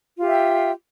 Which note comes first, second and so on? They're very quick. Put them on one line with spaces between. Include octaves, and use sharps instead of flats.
F4 G4 E5 G5